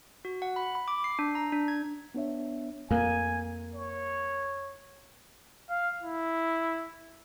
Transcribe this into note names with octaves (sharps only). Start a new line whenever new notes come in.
F#4
F#5
B5
B5
D6
C7
D4
A#5
D4
G#6
B3 D4 C#5 E5
F2 A#3 G#5
C#5
F5
E4